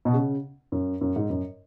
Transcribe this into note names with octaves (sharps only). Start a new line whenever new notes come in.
B2
C#3
F#2
F#2
G#2
F#2